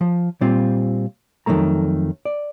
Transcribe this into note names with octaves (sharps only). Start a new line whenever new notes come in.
F3
A#2 G3 C4 F4
F2 D#3 F3 F#3 A3 A#5
D5